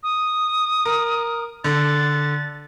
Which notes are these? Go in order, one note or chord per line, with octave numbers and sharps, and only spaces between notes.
D#6
A#4
D3 A6